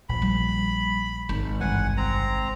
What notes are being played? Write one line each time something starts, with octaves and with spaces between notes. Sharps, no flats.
A#1 A#2 F3 B5
G3
G#1
C2 G2 E3 F#5 G#5
C4 A#5